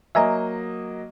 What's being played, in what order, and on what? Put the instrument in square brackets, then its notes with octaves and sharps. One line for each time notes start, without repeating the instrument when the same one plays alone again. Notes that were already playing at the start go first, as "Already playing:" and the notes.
[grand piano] F#3 A#3 D#5 [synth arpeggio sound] E5 G#5 A#5